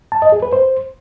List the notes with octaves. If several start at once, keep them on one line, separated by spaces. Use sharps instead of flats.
A5
D#5
G#4
B4
C5